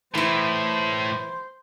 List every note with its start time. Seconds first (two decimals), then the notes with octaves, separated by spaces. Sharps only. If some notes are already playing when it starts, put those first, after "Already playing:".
0.15 A2 E3 E4 C5